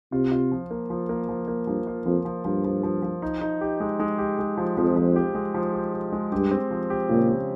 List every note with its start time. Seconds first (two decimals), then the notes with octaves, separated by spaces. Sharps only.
0.12 C3 F4
0.31 F4
0.52 F3
0.71 A#3
0.90 F3
1.09 A#3
1.29 F3
1.48 A#3
1.67 G2 F3
1.87 F4
2.06 F2 F3
2.25 F3
2.45 G2 F3
2.65 F3
2.83 F3
3.02 F3
3.22 D#4
3.41 D#4
3.61 G4
3.80 G#3
4.00 G#3
4.18 G4
4.39 G#3
4.57 F3
4.77 F2 F3
4.96 F3
5.16 G4
5.35 G#3
5.54 F3
5.73 G4
5.93 G4
6.12 G#3
6.32 G2 G4
6.51 C4
6.71 F3
6.90 G4
7.09 A#2 C#3
7.29 G4